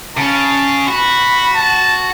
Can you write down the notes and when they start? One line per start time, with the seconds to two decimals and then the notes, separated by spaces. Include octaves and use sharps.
0.17 C#3 C#4 A5
0.88 F#4 B5
1.55 A5